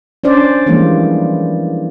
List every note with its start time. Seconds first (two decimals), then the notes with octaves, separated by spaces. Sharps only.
0.24 C#4 D4 C5 D5
0.66 E3 F3 G3 G#3 A#3